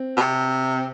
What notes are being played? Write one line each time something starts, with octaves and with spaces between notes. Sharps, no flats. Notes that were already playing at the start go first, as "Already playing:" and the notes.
Already playing: C4
B2
C3